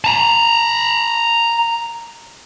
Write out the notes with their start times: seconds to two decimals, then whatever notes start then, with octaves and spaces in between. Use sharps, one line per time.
0.04 A5 A#5